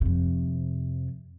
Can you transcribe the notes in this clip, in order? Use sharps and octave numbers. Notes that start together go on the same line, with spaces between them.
F2 C3